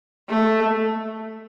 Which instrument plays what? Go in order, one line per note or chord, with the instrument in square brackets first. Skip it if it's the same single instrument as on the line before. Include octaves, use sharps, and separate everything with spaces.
[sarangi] A3